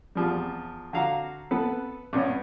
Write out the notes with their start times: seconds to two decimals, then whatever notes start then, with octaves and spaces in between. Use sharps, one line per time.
0.15 E2 F3 G3
0.93 D3 F#4 F5 A#5
1.51 B3 A4 B4
2.13 G2 C3 B3 C#4